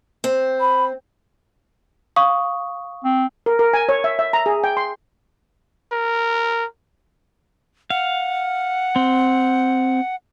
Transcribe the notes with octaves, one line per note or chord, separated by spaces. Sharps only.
C4
B5
F5 C#6 D#6
C4
A#4
A#4
G#5
C#5
E5
E5
A#5
G#4
G5
C6
A#4
F5 F#5
C4